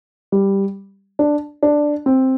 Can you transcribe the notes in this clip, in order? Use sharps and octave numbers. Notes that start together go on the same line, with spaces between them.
G3
D4
D4
C4